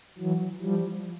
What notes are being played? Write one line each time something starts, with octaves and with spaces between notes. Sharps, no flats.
E3 F#3
F3 G3